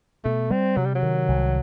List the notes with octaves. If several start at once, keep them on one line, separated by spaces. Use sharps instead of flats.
B2 A3
G3 C4
C3 F#3
G3
F#3
D#3
C2